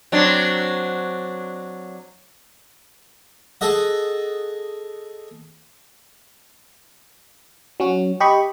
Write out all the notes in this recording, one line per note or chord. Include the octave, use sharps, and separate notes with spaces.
F#3 C4 D4
G#4 A4 D#5 F#5
F#3 C#4 F#4
G4 D#5 B5 C#6